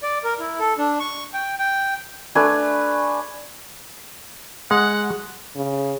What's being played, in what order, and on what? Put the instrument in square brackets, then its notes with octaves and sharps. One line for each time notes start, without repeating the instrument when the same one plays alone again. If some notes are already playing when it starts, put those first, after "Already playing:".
[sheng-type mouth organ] D5
A#4
E4
A4
D4
C#6
G5
G5
[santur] A3 D4 B4 G#5
[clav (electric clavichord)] G#3 [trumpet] F#5
[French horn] C#3